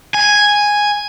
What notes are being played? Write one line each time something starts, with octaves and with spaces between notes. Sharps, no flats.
G#5